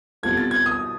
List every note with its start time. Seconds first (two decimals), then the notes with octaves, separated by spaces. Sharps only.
0.23 B2 G3 C4 F4 A4 G#6
0.37 A6
0.51 G#6
0.66 D#6